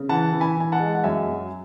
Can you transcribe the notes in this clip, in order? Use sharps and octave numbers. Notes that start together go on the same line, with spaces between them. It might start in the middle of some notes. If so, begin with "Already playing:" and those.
Already playing: C#3
E3 F#5 A5
E3
G#5 B5
E3 G#5
F#5 A5
G#3
F#5
F#2 E5 G#5
F#3